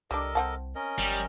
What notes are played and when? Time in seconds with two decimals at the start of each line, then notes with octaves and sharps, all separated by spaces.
0.11 C2 G3 D4 A4 A#4 D#5
0.35 C2 C4 F#5 A5
0.75 C#4 A#4 D#5
0.98 G1 G3